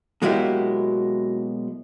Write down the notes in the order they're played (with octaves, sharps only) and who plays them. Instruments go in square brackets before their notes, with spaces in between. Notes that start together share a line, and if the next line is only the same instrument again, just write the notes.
[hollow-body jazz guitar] B2 F#3 G#3 A#3 E4 G4